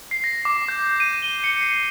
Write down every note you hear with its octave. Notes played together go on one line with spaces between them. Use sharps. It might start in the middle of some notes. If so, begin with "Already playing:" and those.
C7
A#6
D6
G6
D#7
G7
C#7
C7